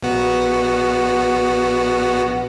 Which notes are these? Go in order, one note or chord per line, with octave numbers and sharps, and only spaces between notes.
A#1 B3 F#4